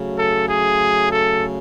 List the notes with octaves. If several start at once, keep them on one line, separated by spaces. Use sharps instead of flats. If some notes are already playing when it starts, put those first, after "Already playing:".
Already playing: C#3 F#3 A3
A4
G#4
A4